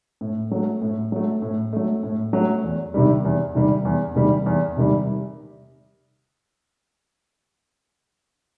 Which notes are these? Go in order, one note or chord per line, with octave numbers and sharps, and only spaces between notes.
A2
F#3 A3
A2
F#3 A3
A2
F#3 A3
A2
F#3 A3
E2
C3 D#3 G3
E2
C3 D#3 G3
E2
C3 D#3 G3
E2
C3 D#3 G3